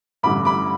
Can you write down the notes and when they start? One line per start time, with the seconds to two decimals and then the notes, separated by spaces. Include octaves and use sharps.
0.23 A1 G2 D3 B5 D6
0.45 B5 D6